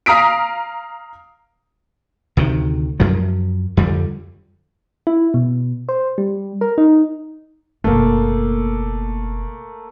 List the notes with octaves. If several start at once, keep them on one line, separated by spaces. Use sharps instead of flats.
F5 A#5 D#6 B6 D7
D2 C3 D#3
F#2 F3 F#3
F2 D3 G3
E4
B2
C5
G3
A#4
D#4
F#1 B2 A3 A#3